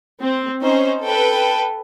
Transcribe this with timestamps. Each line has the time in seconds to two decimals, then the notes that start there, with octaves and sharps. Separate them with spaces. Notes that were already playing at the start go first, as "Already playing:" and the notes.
0.21 C4
0.62 C#4 D#4 C5
1.04 A4 B4 G5